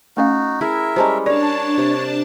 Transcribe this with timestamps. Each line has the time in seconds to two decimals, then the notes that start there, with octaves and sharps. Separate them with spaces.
0.17 A3 C#4 D#4 F#4 F5
0.61 E4 G#4 A#4 E5
0.96 G3 G#3 C#4 C5 A5 A#5
1.26 D4 A#4 C#5 D5 F5 A5
1.78 C3